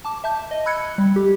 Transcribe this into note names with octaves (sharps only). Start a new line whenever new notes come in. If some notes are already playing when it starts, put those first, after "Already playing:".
A5 D6
E5 A5 G6
D#5
B5 E6 F#6 G#6 C#7
G3
G4